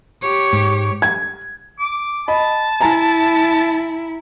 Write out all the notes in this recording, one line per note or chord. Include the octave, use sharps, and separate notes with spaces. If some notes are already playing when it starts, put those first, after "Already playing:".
G4 C#5
G#2
G#6
D6
D#5 A5 B5
E4 G#5 A#5 A6